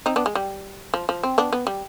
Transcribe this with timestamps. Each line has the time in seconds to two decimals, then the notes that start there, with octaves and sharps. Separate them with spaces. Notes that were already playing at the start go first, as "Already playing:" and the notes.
0.06 C4 D#4
0.16 B3 D4
0.26 G#3
0.35 G3
0.94 F3
1.09 F3
1.23 C4
1.38 B3 D4
1.52 B3
1.67 G3